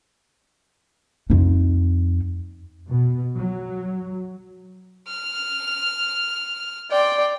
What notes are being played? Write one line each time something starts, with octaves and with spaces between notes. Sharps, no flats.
F2 D#4
B2
F#3
F6
D5 G5 C6